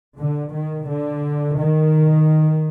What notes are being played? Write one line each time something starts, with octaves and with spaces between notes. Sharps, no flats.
D3
D#3
D3
D#3